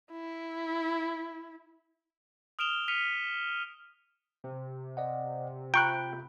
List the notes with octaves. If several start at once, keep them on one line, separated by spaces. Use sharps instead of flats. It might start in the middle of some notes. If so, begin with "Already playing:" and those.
E4
D#6 F6 D7 E7 F7 G7
F6 B6 C#7 D#7 F7
C3
D5 D#5 F#5
F4 G5 A#5 B5 C#6 F#6